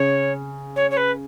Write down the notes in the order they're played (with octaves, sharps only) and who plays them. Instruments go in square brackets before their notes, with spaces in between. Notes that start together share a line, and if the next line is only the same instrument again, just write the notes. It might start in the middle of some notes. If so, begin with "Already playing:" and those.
Already playing: [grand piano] C#3 [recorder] C#5
[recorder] C#5
C#5
B4